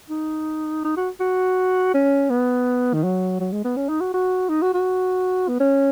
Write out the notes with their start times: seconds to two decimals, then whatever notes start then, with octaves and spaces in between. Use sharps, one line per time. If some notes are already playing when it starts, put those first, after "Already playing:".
0.10 D#4
0.84 D#4
0.96 F#4
1.20 F#4
1.94 C#4
2.30 B3
2.93 D#3
3.04 F#3
3.40 F#3
3.52 G#3
3.64 B3
3.77 C#4
3.89 D#4
4.00 F#4
4.14 F#4
4.49 D#4
4.62 F#4
4.74 F#4
5.48 B3
5.60 C#4